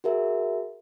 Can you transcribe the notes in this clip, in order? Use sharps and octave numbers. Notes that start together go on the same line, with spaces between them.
F#4 G#4 A#4 E5